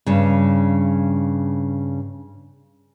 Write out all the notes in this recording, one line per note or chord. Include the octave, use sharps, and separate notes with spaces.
G2 C#3